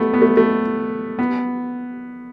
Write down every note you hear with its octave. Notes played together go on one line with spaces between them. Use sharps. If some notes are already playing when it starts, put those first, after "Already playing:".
Already playing: A3 B3
B3
A3
A3
B3